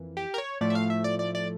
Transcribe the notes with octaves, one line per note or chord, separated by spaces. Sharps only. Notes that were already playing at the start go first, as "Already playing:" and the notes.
Already playing: F2 E3 A#3
G4
A#4
C#5
A2 F3 A3 D5
E5
F5
E5
D5
D5
D5